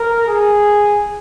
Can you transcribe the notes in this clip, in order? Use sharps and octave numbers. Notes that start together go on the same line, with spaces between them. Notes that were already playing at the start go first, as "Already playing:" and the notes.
Already playing: A#4
G#4